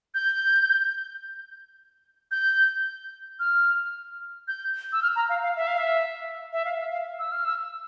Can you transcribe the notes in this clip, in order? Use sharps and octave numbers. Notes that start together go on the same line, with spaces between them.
G6
G6
F6
G6
E6
F6
A#5
F5
F5
E5
F5
E5
E5
F5
E5
F5
E6
F6
E6